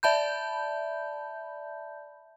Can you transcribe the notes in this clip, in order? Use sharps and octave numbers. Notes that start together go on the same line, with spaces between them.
D5 E5 A5 B5 G6